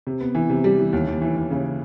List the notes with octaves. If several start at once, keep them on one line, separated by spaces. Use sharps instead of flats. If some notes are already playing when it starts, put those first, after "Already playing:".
C3
B3
E3
C3
G3
E3
D#2
D#2
E3
D#2
C#3